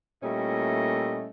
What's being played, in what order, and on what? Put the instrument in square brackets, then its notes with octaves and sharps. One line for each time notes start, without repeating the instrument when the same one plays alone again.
[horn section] A#2 G3 A3 C#4 E4 D#5